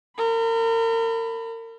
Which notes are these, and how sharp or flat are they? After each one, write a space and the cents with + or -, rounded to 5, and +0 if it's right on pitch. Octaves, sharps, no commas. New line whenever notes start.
A#4 -35 B5 +10